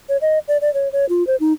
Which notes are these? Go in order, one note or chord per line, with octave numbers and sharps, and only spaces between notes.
C#5
D#5
D5
D5
C#5
C#5
F4
C5
D#4